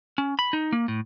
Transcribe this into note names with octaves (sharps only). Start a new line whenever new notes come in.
C#4
B5
D#4
A#3
A2